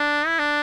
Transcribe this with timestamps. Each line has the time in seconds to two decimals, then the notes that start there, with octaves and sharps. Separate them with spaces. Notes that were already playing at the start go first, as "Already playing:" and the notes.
Already playing: D4
0.27 E4
0.39 D4